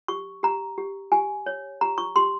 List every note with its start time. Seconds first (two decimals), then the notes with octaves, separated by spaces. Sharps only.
0.08 G4 C#6
0.43 G4 A#5
0.78 G4
1.12 G4 G#5
1.46 C#5
1.81 G4 A#5
1.98 C#6
2.16 G4 C6